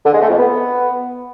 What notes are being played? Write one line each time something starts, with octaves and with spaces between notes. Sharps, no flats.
D3
G#3
A3
F2
B3